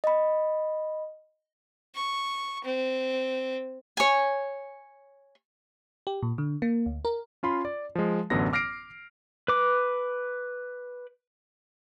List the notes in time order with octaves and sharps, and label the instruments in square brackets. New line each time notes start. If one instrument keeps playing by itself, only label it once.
[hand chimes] D#5 B5
[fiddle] C#6
C4
[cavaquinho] C#5 G#5
[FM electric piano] G4
A#2
D3
A#3
D2
A#4
[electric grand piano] C#4 F4 B5 C6
D5
F3 G#3
A1 F#2 D3 F#3 B3 A#6
D6 F6 A#6 C7 D7
[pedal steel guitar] B4 D6